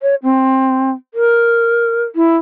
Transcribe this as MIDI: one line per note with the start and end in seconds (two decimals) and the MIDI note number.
0.02 0.15 73
0.23 0.91 60
1.14 2.03 70
2.16 2.36 64